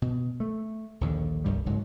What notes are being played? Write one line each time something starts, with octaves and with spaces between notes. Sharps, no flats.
B2
A3
A#1 D#2 D3
F1 C2 G2 G3
F#1 G#2 F#3